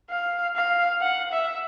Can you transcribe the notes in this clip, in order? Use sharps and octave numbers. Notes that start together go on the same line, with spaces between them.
F5
F5
F#5
E5